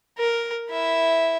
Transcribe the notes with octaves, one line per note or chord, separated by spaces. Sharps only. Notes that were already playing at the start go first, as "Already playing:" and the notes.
A#4
E4 E5